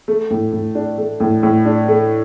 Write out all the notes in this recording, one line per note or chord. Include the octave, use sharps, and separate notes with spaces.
A3
A2
A2
D4
A3
A2
A2
D4
A3